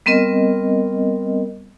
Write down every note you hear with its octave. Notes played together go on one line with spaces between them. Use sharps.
G3 B3 C4 A#4 D#5